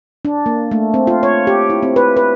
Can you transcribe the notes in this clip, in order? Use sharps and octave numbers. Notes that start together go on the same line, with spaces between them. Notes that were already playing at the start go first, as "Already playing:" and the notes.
D4
A#3
A3
C4
F4
C#5
G4
E4
C4
B4
B4